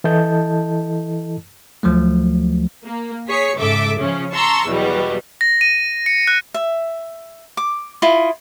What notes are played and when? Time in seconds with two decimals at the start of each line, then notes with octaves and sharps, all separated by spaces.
0.04 E3 E4 A4 D#5 A5 G6
1.83 D2 F3 F#3 A3
2.85 A#3
3.27 G#4 C#5 B6 C#7
3.58 G#2 C#3 A4 E5 D6
3.98 C#3 F3 C#4
4.34 A5 A#5 C6 C#6 E6
4.66 E2 B2 F#3 G3
5.41 A#6
5.61 D#7
6.06 C#7
6.27 F#6
6.54 E5
7.57 D6
8.02 E4 F4 D#5